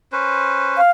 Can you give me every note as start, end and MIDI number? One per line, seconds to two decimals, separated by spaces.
0.12 0.81 61
0.12 0.81 71
0.12 0.81 72
0.77 0.91 77